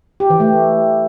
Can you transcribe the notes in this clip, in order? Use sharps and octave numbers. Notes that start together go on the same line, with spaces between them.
G4
E3
A3